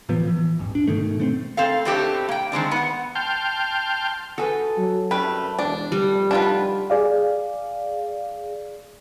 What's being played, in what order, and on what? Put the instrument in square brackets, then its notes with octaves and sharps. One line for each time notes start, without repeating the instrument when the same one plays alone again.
[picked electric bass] A2 E3 F3 B3
E3
D#1 G#1
D4
G#2 B2 D#3 A3
A3 B3 C4
[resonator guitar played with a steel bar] C4 A4 F5
B2 A3 C4 D4 G4 A4
A#3 G5
D#3 G#3 C4 D4
B3 F#5
[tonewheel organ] G5 A5 C6 F6 G6
[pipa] F#4 G#4 B4 [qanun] A4
[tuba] F#3
[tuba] F#2 [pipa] C3 G3 A3 [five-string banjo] B4
[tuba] E1 [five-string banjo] D4 [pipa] D5
[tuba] F1 [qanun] G3
[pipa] D3 D#3 [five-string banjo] D4 F4 B4
[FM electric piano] G#4 D5 F5